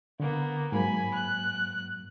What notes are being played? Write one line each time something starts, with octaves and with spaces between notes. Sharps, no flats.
D3 A#3 B3
G#2 F#3 A#3 G#5 B5
F#6